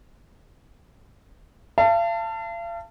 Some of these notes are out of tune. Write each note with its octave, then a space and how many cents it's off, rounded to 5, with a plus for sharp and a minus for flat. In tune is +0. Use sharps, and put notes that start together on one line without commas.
F5 -40 A5 +20